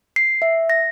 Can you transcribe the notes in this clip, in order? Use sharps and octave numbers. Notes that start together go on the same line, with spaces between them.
C7
E5
A#6